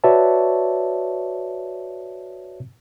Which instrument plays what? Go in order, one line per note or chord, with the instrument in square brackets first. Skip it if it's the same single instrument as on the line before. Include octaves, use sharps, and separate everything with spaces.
[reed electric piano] F#4 B4 C#5 D5 E5 A5